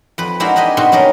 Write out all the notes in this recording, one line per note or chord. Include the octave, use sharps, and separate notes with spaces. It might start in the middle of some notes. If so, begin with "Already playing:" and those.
F2 B4
G#3 C4 D4 E4 F#4 A#4
D4 G4 B4 D#5 G#5
G#2 B2 C4 F#4 B4 C6
F#3 G3 C#4 A#4 D#5